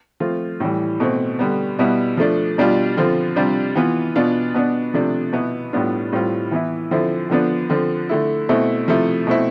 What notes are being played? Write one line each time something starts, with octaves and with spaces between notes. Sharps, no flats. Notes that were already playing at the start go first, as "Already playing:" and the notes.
F3 A3 C4 F4
A2 E3 G3
B2 A3 C4
D3 G3 B3
B2 G3 B3 E4
F3 A3 D4
B2 G3 D4 F4
D3 F3 C4 F4
C3 G3 D4 F4
E3 B3 F4
B2 B3 D4 F4
B2 B3 D4
C3 F3 A3 D4
B2 B3 E4
A2 G3 B3 D4 F4
A2 G3 C4 F4
E3 B3 E4
D3 F3 C4 E4
D3 F3 B3 D4
D3 F3 C4
D3 A3 E4
B2 A3 C4 E4
C3 F3 A3 E4
B2 A3 C4 E4